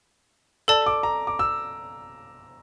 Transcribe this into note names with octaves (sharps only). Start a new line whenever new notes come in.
A4 D5 A5 E6
D6
A#5
D6
E6